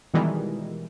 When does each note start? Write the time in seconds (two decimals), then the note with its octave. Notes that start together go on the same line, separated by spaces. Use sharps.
0.14 B2 D#3 E3 G3 G#3